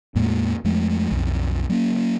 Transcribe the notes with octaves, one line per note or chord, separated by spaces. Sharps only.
E2 A2 G#3 A#3
F2 F3 G#3 A3
B1 F2 F3
F#3 A#3 B3 C#4